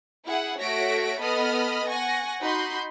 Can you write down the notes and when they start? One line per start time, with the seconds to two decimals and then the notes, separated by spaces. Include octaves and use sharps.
0.25 E4 G#4 F#5
0.59 A3 F#4 C#5 A#6 B6 D7
1.20 B3 A4 D#5 B5 D#6 F6
1.88 F#5 G#5 C#6 A#6
2.41 D#4 F#4 B5 C6 G6